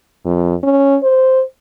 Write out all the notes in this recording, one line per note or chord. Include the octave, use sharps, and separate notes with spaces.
F2
C#4
C5